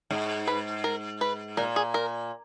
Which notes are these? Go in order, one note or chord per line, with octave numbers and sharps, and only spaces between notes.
G#2
B4
A#4
B4
A#2 A#4
G#4
A#4